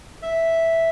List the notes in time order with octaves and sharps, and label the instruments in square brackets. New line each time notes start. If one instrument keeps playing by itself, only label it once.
[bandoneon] E5